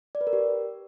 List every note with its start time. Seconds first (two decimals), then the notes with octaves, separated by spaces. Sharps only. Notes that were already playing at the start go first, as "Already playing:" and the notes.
0.15 D5
0.21 B4
0.27 A#4
0.33 G4